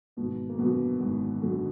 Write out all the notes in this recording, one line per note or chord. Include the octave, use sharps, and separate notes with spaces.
G#1 B2 B3
A#3
F#2 B2 D3 F#3 B3
G#1
F#2 D3 F#3